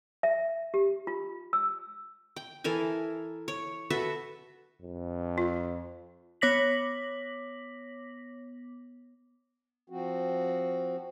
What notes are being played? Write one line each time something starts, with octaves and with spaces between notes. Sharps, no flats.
E5
G4
F4
E6
G5
E3 A4 A#4 G#5
C#5
F#4 A4 B4 E5
F2
F4
B3 C#5 D6 A#6 B6 F#7
F3 C4 F#4